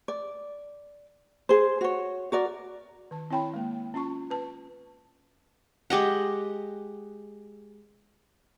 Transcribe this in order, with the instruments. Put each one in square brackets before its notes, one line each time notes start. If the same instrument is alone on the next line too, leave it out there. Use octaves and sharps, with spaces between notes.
[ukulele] D5
G#4 C5
F#4 C#5
F#4 A#4 D5
[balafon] D#3 A5
C4 E4 C#5 G5 A5 B5
G#3 A#3
C#4 F4 A5 C#6
B4 A5
[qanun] G#3 G4 D#5 F#5